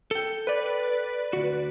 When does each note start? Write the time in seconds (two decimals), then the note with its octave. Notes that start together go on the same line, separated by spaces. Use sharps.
0.11 A4 G5
0.47 B4 D5
1.33 D2 F#4